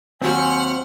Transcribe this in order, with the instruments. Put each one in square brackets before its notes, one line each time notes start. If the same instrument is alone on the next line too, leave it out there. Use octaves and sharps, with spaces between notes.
[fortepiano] D#2 F#3 [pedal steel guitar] C4 C5 [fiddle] F#5 F6 [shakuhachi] G#5